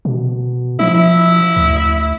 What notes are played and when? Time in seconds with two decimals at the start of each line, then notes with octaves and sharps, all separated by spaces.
0.05 B2
0.79 F3 E4
0.95 E4
1.56 D2